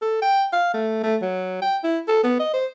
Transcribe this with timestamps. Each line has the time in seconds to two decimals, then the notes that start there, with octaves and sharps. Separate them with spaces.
0.02 A4
0.22 G5
0.53 F5
0.74 A3
1.03 A3
1.22 F#3
1.62 G5
1.84 E4
2.08 A4
2.23 B3
2.40 D#5
2.54 C5